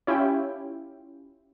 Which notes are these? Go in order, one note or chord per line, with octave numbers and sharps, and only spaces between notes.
C#4 E4 F4 G4 G5